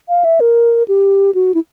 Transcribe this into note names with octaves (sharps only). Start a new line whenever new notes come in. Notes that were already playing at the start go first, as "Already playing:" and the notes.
F5
E5
A#4
G4
F#4
E4